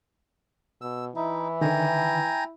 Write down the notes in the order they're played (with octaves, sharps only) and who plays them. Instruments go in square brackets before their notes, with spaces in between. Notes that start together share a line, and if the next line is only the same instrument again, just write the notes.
[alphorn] B2 [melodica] E6
[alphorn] E3 [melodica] D#4 [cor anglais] E4
[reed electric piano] D3 D#3 [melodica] G5 G#5 A#5